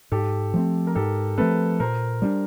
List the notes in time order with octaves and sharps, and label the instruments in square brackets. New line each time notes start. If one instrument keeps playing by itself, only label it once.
[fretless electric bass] G#2 [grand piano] G4 A4
[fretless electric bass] F3 A3 C4
[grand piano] A#4
[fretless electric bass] G#2 [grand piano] G4 A4
[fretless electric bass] F3 A3 C4 [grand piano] A4 B4
[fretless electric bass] A#2 [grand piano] A#4 C5
[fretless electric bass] G3 B3 D4